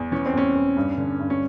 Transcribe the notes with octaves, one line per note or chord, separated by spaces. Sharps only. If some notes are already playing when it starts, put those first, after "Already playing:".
Already playing: E2
E3 C#4
C4
E2 C#4
E2
G2
D3
G2
C#4